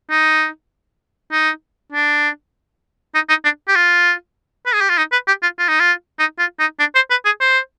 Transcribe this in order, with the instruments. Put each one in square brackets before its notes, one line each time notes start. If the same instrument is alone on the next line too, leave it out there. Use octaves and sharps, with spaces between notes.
[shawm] D#4
D#4
D4
D#4
D#4
D4
G4
F4
B4
G#4
G4
F4
D#4
B4
G4
F4
F4
D#4
F4
D#4
F4
D#4
D4
C5
B4
G#4
C5